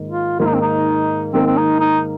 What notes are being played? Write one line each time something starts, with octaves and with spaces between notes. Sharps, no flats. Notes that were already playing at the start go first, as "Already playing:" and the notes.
Already playing: G#2 D#3 A#3
F4
G#2 D#3 A#3 F4
D#4
C4
D#4
G#2 D#3 A#3 C4
C4
D#4
D#4